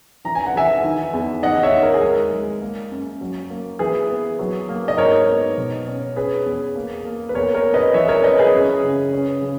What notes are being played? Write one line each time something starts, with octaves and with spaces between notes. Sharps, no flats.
E3 A#5
G#5
F#5
E3 E5 G#5
D#3
E2
D#2 D#5 F#5
C#5 E5
D#2
A#4
G#4
G#3 A#4
G#3
A#3
F#2
F#3
A#3
E3 G#4 B4
B3
F#3
A#3
D#5
G#2 A#4 C#5
B3
B2
C#4
C#4 G#4 B4
E2
A#3
A#3
B4
E2 A#4 C#5
A#4 C#5
B3
B4 D#5
E3 C#5 E5
A#4 C#5
C#4 B4 D#5
G#4 B4
F#2
C#3
C#4
C#3